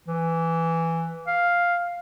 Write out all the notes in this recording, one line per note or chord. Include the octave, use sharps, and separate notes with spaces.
E3
F5